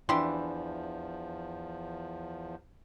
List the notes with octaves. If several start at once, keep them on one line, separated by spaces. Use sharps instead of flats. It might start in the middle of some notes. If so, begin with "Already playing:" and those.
E2 E3 F3 D4 E4 G4 C6